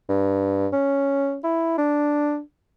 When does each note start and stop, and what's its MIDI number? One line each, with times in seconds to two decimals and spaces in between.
0.09 0.67 43
0.73 1.38 61
1.44 1.76 64
1.78 2.40 62